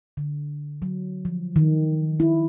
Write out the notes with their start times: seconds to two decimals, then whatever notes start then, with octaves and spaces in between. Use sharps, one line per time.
0.17 D3
0.82 F#3
1.25 F3
1.56 D#3
2.20 E4